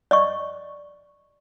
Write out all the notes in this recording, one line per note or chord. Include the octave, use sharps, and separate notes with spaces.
D5 D#5 C#6